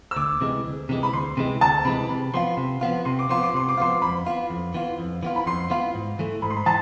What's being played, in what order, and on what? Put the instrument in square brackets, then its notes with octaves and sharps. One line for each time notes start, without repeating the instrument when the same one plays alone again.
[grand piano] E6
[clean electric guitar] D2 [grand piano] D6
[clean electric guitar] C3 E3 G#3
D2
C3 E3 G#3
[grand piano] B5
[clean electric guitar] D2 [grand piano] C6
[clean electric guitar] C3 E3 G#3
[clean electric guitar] D2 [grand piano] A5
[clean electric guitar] C3 E3 G#3 [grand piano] B5
[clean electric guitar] C3 [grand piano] B5
[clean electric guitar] F3 B3 F4 [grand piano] C6
[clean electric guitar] C3
F3 B3 F4
[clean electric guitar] C3 [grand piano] C6
[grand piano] D6
[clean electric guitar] F3 B3 F4 [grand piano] C6
[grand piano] D6
[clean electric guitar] C3 [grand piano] C6
[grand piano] D6
[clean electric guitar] F3 B3 F4 [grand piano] C6
[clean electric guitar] F2 [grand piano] B5
[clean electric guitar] E3 B3 F4
F2
E3 B3 F4
F2
E3 B3 F4
[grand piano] B5
[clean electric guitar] F2 [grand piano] C6
[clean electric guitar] E3 B3 F4
G#2
E3 A3
[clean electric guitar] G#2 [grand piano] B5
[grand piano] C6
B5
[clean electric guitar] E3 [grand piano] A5